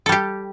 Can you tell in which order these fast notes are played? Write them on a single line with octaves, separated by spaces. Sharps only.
A4 G3 G4